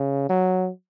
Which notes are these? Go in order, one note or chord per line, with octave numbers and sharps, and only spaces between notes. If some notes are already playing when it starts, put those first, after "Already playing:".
Already playing: C#3
F#3